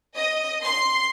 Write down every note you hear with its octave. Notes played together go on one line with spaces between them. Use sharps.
D#5
C6